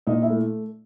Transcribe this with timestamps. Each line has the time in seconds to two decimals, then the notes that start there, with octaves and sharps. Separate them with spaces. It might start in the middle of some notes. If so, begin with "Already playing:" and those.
0.07 A#2 D#4 D#5
0.22 E4 E5
0.30 A3